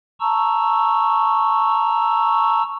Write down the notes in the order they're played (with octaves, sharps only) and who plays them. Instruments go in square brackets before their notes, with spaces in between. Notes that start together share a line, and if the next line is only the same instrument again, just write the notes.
[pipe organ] A5 A#5 C#6 E6